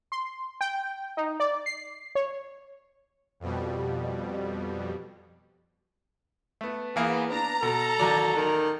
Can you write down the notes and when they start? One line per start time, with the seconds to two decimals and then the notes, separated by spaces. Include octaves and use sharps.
0.12 C6
0.61 G5
1.17 D#4
1.40 D5
1.66 C7
2.15 C#5
3.40 F2 B2 G3
6.61 A3 B3
6.96 E3 A#3 B3 G#4
7.31 B3 D4 A#5
7.63 B2 A4
7.99 A1 D#2 F#3 D5
8.36 D#3